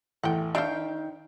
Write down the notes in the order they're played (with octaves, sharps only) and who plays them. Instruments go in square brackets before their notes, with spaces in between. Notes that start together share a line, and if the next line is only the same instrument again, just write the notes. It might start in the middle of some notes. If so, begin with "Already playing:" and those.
[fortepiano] A1 E2 [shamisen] F#5 G5
[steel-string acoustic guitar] D#3 G5 [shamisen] D4 C5 [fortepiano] E5 F5